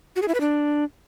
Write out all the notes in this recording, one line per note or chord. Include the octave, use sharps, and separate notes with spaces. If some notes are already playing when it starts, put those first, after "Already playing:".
F#4
G#4
E4
B4
D4